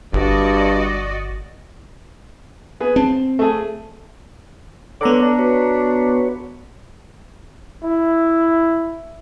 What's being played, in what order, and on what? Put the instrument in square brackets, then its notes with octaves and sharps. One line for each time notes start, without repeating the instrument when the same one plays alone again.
[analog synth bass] G1 [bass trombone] G2 [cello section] F#4 D5 D#5
[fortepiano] B3 G#4
[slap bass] C4 [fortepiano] A5
[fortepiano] A3 G#4
[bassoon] D3 [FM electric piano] B3 A#5 D6 [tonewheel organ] C#5 F#5
[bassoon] D4
[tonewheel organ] F#4 B4 C#5
[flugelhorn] E4